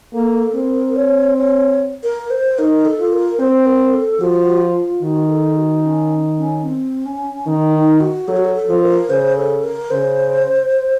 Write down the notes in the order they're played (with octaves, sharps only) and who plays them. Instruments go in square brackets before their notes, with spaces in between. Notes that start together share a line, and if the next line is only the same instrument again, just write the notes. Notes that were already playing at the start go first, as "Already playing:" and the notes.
[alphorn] A#3 [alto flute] A4
[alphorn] C4 [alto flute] A#4
[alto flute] C#5
C#5
A#4
C5
[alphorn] D#4 [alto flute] A#4
[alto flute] A4
[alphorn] F4
[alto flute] A#4
[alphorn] C4 [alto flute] C5
[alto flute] A#4
A4
[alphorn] F3 [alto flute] F#4
[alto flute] F4
[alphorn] D#3 [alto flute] F#4
[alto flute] A4
F#4
C#4
C#4
C4
C#4
[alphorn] D#3 [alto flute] D#4
[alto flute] D#4
F#4
[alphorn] F#3 [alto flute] A4
[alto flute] F#4
A4
A4
[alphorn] F3
[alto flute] A#4
[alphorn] C#3 [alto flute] C5
[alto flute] A4
A#4
[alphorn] C#3 [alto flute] C5